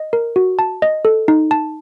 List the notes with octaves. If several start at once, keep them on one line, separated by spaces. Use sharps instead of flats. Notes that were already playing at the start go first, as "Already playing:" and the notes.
Already playing: D#5
A#4
F#4
A5
D#5
A4
D#4
A5